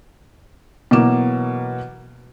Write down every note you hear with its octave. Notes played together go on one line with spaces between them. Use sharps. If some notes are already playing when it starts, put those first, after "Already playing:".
B2 E3 F#3 A#3 D6 E7